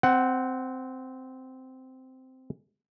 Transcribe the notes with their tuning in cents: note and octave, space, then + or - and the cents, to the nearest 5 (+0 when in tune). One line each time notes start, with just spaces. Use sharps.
C4 -10 F#5 +15